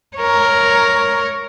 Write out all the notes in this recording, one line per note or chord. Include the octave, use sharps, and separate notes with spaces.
A#4 C#5